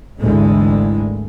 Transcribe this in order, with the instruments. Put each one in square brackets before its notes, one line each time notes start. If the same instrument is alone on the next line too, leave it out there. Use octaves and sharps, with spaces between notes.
[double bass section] G#1 D2 D3 E3 G#3